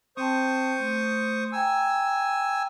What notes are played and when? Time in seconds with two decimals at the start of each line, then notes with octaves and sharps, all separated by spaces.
0.17 C4 C5 G5 A5 C#6 D#6
0.79 A3
1.53 G5 G#5 A#5 E6